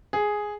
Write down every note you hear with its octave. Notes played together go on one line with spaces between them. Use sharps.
G#4